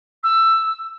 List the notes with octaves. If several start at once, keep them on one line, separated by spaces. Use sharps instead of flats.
E6